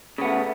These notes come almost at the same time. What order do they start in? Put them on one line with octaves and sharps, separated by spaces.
C#3 B3 A3